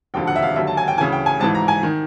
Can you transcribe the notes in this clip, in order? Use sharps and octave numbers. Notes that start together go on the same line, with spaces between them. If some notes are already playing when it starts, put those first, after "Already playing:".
E1 D#2 D3 F3 G5
F#5
E5
F5
D#2 D3 F#3 E5
A5
G#5
G5
D2 C#3 E3 G#5
G5
G#5
G#1 G#2 E3 A5
A#5
G#5
D#3